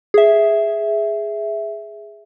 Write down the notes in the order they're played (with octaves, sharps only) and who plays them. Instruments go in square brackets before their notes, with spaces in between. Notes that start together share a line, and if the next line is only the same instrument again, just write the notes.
[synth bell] G#4 E5